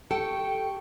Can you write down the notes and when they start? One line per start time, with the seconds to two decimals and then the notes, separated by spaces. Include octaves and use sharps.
0.11 G4 A4 G5 C#6